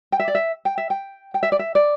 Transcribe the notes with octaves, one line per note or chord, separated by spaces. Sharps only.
G5
E5
D5
E5
G5
E5
G5
G5
E5
D5
E5
D5